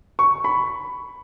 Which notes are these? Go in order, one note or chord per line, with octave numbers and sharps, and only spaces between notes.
C#6
B5